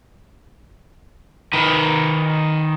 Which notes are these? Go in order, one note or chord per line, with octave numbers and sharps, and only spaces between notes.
D#3 B4